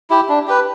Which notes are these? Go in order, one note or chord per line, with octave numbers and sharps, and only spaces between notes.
E4 G4
D4
G4 B4